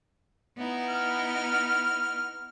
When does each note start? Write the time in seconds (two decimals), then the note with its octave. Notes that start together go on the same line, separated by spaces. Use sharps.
0.56 B3 D#4 E4
0.89 F6